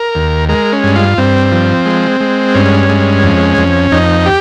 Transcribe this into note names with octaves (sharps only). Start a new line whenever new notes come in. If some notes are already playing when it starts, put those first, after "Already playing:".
Already playing: A#4
D#2
G#3 A#4
C#4
G2
F4
G2 C4
F3
G#3
G#3
G2 C#4
G#3
F2
F2
F2 D#4
G4